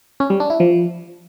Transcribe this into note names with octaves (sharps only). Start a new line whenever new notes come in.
C#4
G3
D4
E4
F3